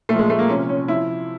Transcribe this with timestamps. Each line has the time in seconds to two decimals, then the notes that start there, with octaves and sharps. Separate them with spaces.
0.09 A#2 A3
0.14 F3 G#3
0.30 A3
0.39 A#3
0.49 C3 F3 C#4
0.69 C#4
0.88 C3 F3 E4